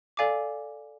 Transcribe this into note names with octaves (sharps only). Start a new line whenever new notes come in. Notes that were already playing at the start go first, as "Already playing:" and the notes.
A4 D5 F5 G#5 D6